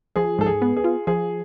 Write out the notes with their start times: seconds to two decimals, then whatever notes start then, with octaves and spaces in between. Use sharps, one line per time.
0.16 F3 G#4
0.39 G#2 A4
0.46 G#4
0.62 B3
0.76 G#4
0.84 F4
1.07 F3 G#4